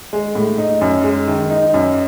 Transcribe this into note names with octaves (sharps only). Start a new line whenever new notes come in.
G#3
A2
D#4
F#2
G#3
D#3
D#4
F#2